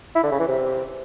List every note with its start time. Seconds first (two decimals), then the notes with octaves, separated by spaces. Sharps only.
0.15 E4
0.23 D3
0.31 C#3
0.39 E3
0.48 C3